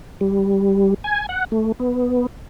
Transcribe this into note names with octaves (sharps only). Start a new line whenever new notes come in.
G3
G#5
F#5
A3
B3